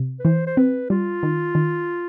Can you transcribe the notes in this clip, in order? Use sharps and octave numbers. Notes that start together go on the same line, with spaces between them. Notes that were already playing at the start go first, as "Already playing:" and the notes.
Already playing: C3
B4
E3 C5
C5
C4 B4
G3 F4
D#3
D#3